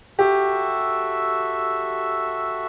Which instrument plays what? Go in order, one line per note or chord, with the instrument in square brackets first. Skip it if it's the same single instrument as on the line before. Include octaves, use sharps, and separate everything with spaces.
[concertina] F#4 A4 E5 [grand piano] G4